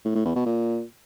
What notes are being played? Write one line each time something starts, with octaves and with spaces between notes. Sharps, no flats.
A2
A2
E2
B2
A#2